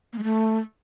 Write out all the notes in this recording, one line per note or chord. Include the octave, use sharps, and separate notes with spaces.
A#3
G#3
A3